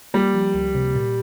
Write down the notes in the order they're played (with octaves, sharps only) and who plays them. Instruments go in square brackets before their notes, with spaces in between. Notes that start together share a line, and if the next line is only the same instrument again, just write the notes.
[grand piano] G3 [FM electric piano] A#3
[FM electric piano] F3
C#2
C3
A#2